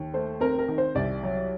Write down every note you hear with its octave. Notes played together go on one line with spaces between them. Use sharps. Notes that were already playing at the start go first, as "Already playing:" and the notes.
Already playing: D#2
A3 C5
C4 A#4
A#4
D#3
C5
C2 D5
F#3